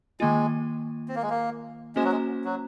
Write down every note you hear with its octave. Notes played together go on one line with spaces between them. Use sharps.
D#3 G#3 A#3 F4
C4
A#3
G#3
A#3
G#3 A#3 C#4 F#4 C5
F#3
G#3
F#3